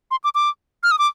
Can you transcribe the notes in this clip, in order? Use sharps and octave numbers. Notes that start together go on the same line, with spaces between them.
C6
D6
D6
F6
D#6
D6